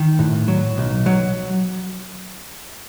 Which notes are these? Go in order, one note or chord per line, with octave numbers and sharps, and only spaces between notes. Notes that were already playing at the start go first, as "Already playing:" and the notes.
Already playing: D#3
A2
F#3
B1
F#3